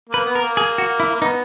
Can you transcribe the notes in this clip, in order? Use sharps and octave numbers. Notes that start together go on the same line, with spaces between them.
A#3 B4
B3
A#4
A#3
G#4
F#4
E4
A#3
B3 D#4